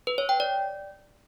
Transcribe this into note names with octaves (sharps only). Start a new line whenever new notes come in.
B4
C#5
G5
D5